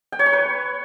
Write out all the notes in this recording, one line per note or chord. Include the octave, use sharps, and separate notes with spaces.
G5
C#5
C#6
B4